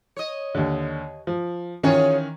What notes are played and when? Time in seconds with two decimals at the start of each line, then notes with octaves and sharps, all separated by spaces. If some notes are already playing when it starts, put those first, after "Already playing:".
0.17 C#5 D#5
0.55 D#2 D3
1.27 F3
1.83 D#3 E3 C#4 F4 G#4 C#5